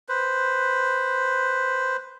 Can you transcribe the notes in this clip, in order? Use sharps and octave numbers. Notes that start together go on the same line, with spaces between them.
B4 C5